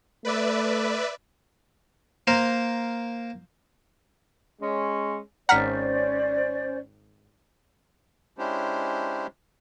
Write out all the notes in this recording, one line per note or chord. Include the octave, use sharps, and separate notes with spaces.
A3 B4 D5 E5
A#3 A#4 C5
G#3 C#4
G#1 C#4 C5 D5 F#5 A#5 F6 B6
G#3 C#4 D4 E4 G4 C5